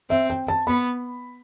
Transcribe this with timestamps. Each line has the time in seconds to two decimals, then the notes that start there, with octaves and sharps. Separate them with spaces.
0.10 C4 E5
0.30 G5
0.48 A5
0.67 B3 B5